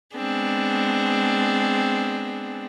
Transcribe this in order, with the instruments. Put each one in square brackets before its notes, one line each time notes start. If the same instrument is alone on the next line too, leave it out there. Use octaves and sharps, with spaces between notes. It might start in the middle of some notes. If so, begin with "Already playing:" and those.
[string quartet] G#3 B3 C4 D4 G#4